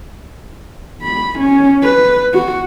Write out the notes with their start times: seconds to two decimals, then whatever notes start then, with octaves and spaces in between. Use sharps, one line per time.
1.02 B5
1.39 C#4
1.83 B4
2.33 F#4